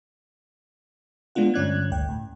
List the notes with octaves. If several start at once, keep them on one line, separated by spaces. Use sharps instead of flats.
G#3 B3 D4 F4 F#5
G2 D3 C#4 D5 F#6 G#6
G#1 D2 G5
A2